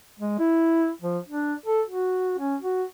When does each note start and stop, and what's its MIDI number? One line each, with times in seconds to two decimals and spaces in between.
0.19 0.36 56
0.39 0.90 64
1.02 1.18 53
1.28 1.54 62
1.66 1.81 69
1.88 2.34 66
2.38 2.56 61
2.61 2.84 66